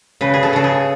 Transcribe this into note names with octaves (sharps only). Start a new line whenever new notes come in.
C#3 B4
G#4
A4
C#3 A4
G#4